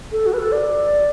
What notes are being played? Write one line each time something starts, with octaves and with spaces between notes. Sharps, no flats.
A4
F#4
B4
A4
D5